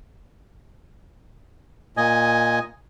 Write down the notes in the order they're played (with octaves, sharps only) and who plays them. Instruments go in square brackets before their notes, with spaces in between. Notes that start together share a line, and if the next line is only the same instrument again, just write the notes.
[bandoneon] A#2 D#5 G#5